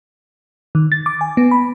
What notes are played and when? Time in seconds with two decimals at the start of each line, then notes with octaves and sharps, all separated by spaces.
0.75 D#3
0.92 A6
1.06 D6
1.21 G#5
1.37 B3
1.51 B5